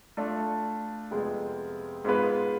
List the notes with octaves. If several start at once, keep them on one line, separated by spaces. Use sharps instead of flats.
A3 D4 F4 A4 D5
F2 C3 G#3 B3 F4
G#2 G#3 B3 F4 B4